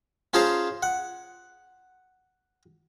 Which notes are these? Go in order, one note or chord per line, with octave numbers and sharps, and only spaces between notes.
C#4 F4 G#4 C5 A5 A#5
F#5